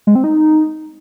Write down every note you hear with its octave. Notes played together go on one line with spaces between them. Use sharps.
G#3
C4
D#4